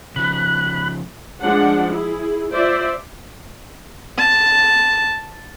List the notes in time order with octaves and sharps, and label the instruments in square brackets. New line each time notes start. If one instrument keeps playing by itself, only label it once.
[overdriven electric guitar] C#3 F3 [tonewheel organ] B5 F#6
[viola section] F3 G#3 D4 F#5
E4 G#4
F4 C5 D5 E5
[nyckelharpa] A5